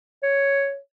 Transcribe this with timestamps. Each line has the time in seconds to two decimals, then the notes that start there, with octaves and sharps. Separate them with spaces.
0.23 C#5